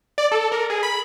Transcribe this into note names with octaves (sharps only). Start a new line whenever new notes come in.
D5
A4
A#4
G#4
B5